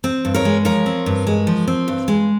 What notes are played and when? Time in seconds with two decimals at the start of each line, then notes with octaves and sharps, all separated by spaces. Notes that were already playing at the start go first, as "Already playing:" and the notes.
0.04 C4
0.25 G2
0.34 A#4 C#5
0.45 G#3
0.65 F3 A#4 C#5
0.86 C4
1.06 G2
1.27 G#3
1.47 F3
1.68 C4
1.88 G2
2.08 G#3